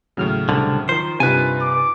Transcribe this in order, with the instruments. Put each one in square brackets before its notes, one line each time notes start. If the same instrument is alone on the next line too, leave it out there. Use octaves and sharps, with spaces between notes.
[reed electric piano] D#2 F#3 F6 [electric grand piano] A2 C#3
[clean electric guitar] C2 D3
[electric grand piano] D#3 F3 [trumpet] A#4 [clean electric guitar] C5
[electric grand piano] G2 D#4 F4 [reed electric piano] C3 [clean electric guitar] B4 G#5
[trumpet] D6